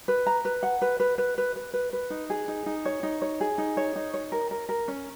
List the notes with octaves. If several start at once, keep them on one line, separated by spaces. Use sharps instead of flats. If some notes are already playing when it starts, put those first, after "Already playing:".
B4
A#5
B4
F#5
B4
B4
B4
B4
B4
B4
B4
D#4
G#4
D#4
D#4
C#5
D#4
C#5
G#4
D#4
C#5
D#4
C#5
A#4
A#4
A#4
C#4